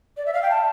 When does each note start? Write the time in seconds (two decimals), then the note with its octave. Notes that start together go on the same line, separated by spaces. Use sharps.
0.17 D5
0.26 E5
0.33 F5
0.43 G5
0.50 A5